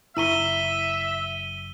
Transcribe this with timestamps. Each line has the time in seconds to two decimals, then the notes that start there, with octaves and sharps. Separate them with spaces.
0.17 F#1 E4 E5 A#5 C#6 E6 D#7 G7